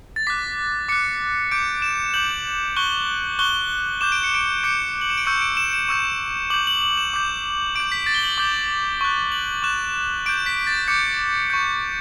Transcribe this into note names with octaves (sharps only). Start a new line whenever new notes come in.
A6
D6 F#6 B6
D6 F#6 C#7
D6 G6 D7
E7
D6 G6 F#7
C#6 F#6 G7
C#6 F#6 G7
D6 G6 E7
D7
C#7
D7
D6 G6 C#7
F#7
E7
D7
C#6 E6 G6 C#7
D7
E7
E7
C#6 E6 G6
D6 G6 F#7
F#7
F#7
E7
D6 G6
D6 G6 D7
B6
A6
G7
F#7
D6 G6 F#7
C#6 F#6
F#7
C#6 F#6 E7
D6 G6 D7
B6
A6
D6 G6 C#7
C#6 G6